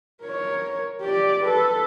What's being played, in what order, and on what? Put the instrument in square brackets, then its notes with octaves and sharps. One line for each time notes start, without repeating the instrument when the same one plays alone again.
[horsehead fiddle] A#4 C#5
G4 D5
A4 B4